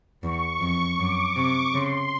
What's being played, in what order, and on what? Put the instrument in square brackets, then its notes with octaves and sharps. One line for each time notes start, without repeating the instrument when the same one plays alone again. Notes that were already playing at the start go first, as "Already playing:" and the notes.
[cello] E2 [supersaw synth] C#6
[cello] F2
[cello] F#2 [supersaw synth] D6
[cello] C3 [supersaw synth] C#6
[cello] C#3 [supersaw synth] C6